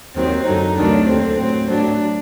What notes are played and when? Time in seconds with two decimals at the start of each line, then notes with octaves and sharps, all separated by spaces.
0.16 D#2 D#3 F#3 C4
0.46 F#2 D3 F#3 D#4
0.77 D2 C3 D#3 F#3 D4
1.08 D#2 D3 F#3 C4
1.39 A2 F#3 C4
1.70 A2 F#3 D4